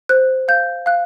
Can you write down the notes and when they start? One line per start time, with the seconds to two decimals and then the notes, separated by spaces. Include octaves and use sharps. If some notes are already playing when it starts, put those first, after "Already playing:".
0.09 C5 F#6
0.48 F5 G6
0.86 F5 F#6